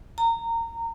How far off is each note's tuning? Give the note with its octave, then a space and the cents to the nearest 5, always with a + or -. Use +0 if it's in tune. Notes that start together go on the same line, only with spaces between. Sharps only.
A#5 -20